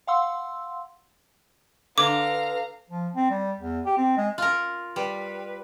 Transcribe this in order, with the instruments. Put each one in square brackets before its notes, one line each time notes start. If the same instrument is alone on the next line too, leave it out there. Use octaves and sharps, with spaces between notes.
[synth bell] F5 F#5 C6 E6
[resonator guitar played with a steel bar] D3 [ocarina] B4 [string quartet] F5 A#5 [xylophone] D6
[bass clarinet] F3
C4
G3
E2
G4
C4
G#3
[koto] F4 A#4
[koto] G3 [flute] B4